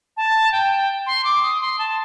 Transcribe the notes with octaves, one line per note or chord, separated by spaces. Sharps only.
A5
G5
C6
D6
D#6
C6
A5